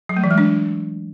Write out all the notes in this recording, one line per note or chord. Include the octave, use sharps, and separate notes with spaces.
F#3
A3
E3
G#3
D4